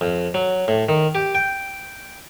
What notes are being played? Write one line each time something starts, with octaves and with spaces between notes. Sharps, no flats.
F2
F#3
A2
D#3
G4
G5